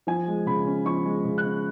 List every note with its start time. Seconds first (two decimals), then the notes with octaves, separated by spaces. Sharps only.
0.07 F3 G#5
0.27 G#3
0.46 C#3 B5
0.66 C#4
0.85 F3 C#6
1.05 G#3
1.25 C#3
1.38 F#6
1.45 C#4